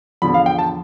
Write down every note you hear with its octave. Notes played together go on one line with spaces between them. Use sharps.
E2 D3 F3 B5
F5
G5
A5